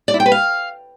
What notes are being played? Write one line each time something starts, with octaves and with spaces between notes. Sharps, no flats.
D5
E4
G5
B4
F5